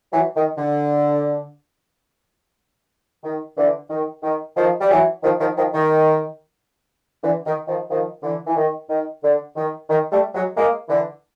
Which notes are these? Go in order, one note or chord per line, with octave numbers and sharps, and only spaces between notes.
E3 F#3
D#3
D3
D#3
D3 E3
D#3
D#3
D#3 F3
G3
E3 F#3
D#3 F3
D#3 F3
D#3 F3
D#3
D3 E3
D#3
D#3 F3
D#3 F3
D3 E3
E3
D#3
D#3
D3
D#3
D#3
G3 A3
F#3 G#3
G#3 A#3
D3 E3